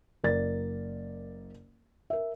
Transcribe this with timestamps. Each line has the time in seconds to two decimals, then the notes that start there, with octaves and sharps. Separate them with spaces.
0.24 F#1 A#4 D5 A6
2.10 A#4 E5